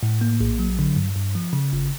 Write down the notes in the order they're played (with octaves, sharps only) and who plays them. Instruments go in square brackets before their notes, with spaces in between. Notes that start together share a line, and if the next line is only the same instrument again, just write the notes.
[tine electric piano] A2
A#3
A#1
F#3
D3
G2
G2
F3
C#3
G1